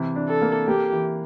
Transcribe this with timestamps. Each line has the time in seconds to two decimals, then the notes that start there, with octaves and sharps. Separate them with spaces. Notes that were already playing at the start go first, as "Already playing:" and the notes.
Already playing: C3 E3
0.16 D4
0.29 A4
0.42 A#3
0.68 A#3 G4
0.93 E3